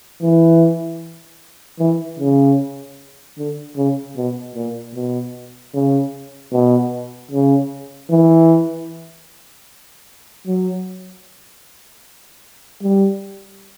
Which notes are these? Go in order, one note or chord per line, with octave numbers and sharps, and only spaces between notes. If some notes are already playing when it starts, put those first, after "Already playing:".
E3
E3
C#3
D3
C#3
B2
A#2
B2
C#3
B2
C#3
E3
F#3
G3